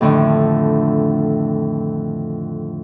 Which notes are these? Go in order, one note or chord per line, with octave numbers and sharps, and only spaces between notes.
F2 A2 D3 D#3